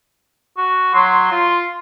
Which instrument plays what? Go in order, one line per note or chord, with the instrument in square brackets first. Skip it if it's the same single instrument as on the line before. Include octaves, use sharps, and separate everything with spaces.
[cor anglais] F#4
[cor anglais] F#3 [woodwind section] C6
[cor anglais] F4